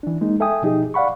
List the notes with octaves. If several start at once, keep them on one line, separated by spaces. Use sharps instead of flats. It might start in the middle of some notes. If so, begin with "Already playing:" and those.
E3 D4
G#3 A#3 D#4 G#4
A4 E5 G5 G#5 D#6
B2 F3 D#4 G4 G#4
D5 F5 F#5 B5 C#6